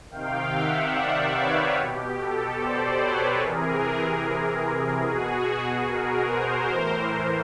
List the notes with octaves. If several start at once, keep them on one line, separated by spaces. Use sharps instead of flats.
C3 D#3 F5 G5
E5 F#5
D5 E5
B4 C#5
B2 G4
G4 A4
C5 D5
B4 C#5
C3 E3 G#4 A#4
B2 F#4 G#4
G#4 A#4
A#4 C5
A2 E3